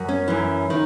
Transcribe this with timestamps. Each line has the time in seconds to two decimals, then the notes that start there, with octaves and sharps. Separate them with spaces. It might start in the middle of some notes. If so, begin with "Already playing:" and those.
Already playing: F#2
0.09 C#4
0.28 F#2 E3
0.70 D#3